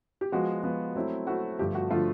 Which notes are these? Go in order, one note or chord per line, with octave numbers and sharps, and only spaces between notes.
G4
F3 G#3 B3 F#4
F3 G#3 B3
F#3 A3 C4 E4
F#3 A3 C4 E4 F#4
G2 D3 F3 A3 G4
F#4
D3 F3 A3 F4